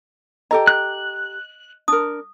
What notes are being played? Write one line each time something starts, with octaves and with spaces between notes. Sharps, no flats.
G4 A4 D#5 A#5
F#6
D4 A#4 D#6